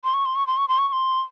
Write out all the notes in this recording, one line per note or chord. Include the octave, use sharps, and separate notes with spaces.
C6
C#6
C6
C#6
C6
C#6
C6
C#6
C#6
C6